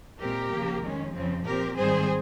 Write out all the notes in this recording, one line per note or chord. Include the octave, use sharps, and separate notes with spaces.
A#2 G#3 C4 G4 A#4
C#3 F3 A#3
F2 D#3 G#3 C#4
F2 C#3 F3 C4
A#2 F3 C4 G4 A#4
G#2 D#3 G3 C4 G#4 C5